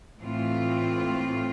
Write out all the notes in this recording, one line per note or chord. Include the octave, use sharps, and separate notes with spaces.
A2 E3 A3 C4 F4